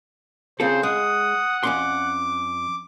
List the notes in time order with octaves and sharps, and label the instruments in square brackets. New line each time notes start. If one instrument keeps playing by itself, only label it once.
[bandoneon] C#3 [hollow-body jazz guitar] C4 F4 A4 [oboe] C5
[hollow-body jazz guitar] G#3 [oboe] F#5 [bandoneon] D#6
[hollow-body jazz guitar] F2 C#4 C6 [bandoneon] D6